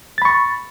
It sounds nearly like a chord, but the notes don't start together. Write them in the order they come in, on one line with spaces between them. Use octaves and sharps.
A6 B5 C#6